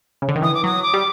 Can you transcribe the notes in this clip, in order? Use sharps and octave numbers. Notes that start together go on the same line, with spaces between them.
C#3
D3
D#3
E3 D#6
D6
F#3 D#6
D6
G3